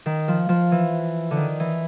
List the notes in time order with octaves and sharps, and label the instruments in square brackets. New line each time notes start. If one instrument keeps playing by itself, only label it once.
[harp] D#3
F3
F3
E3
D3
D#3
E3